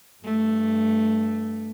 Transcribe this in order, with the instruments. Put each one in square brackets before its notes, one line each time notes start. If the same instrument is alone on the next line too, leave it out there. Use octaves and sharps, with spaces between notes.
[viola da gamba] G2 A3